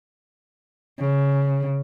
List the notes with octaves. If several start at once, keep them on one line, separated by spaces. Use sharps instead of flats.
C#3